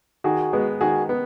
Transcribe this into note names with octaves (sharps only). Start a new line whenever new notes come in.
D#3 F#4 G#4
G#3 B3
D#3 F#4 G#4
B3